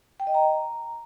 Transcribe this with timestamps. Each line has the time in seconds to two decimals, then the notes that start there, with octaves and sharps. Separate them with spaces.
0.20 G5
0.27 D#5
0.34 A#5